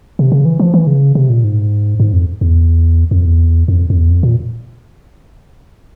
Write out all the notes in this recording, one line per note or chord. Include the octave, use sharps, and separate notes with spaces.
C3
C#3
E3
F3
E3
C#3
C3
A#2
G#2
G#2
F2
E2
F2
E2
F2
F2
E2
F2
A#2